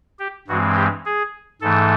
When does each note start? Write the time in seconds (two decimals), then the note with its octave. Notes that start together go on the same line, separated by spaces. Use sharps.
0.19 G4
0.48 G2 E3 G#3 C4 F#4
0.76 G4
1.06 G#4
1.61 G#2 E3 A3 A4